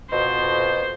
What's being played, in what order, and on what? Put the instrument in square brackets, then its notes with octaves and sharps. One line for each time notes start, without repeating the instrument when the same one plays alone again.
[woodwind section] F2 B2 [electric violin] C5